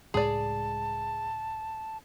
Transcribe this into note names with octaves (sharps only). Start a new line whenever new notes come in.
C#2 A2 G#3 G#4 D5 A5